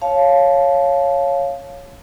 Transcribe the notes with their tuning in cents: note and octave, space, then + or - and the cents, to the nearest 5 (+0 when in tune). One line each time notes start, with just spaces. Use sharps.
C#5 +0 F5 +0 A5 -20